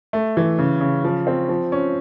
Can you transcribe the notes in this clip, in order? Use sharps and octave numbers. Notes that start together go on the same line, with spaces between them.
A3
E3
C#3
C#3
F3
C4
F3
C#4